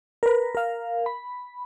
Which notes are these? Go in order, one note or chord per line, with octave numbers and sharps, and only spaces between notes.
A#4 B4
A#4 F5
B5